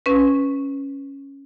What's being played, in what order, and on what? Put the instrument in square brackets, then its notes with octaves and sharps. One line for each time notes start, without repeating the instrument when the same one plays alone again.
[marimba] C#4 B4